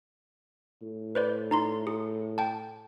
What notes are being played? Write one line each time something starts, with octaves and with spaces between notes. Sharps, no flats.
A2
B4 C5 D5
D#4 A#5 C6
G#4
G5 A5